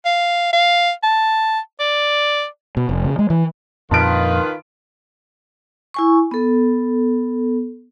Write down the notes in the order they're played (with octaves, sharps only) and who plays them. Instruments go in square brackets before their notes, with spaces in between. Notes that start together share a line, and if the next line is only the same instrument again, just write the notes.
[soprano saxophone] F5
F5
A5
D5
[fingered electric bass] B2
F1
C#3
G#3
E3
[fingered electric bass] F2 A#2 F3 [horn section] D#3 B4 [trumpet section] F4 [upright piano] A5 D7
[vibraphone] E4 G#5 C#6
B3 A4